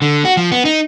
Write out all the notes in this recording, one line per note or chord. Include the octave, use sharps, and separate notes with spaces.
D3
F#4
F3
B3
D#4